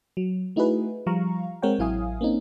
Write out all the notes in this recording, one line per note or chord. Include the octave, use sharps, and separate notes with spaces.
F#3
A3 D#4 E4 F#4 G#4 B4
F3 G3 F5 A#5 C#6
G#3 C4 A#4 C#5 F#5 G5
A1 F#3 E4 F5 G#5 D#6
A#3 C4 C#4 D#4